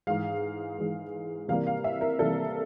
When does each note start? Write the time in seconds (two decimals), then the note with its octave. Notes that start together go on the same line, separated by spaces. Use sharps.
0.07 G#2 E3 G#3 F5
0.78 G#2 E3 G#3
1.48 C3 E3 G3 A#3 F5
1.67 F5
1.84 E5
2.01 A#4
2.19 C3 E3 G3 A#3 A4